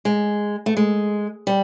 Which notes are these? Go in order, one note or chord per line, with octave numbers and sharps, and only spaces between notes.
G#3
A3
G#3
G3